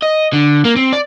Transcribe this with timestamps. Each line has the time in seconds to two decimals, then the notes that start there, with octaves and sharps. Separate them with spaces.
0.03 D#5
0.33 D3
0.65 A#3
0.77 C4
0.93 D5